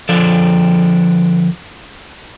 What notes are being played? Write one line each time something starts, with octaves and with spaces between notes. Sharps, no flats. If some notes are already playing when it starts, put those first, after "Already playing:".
D3 F3 A4 D5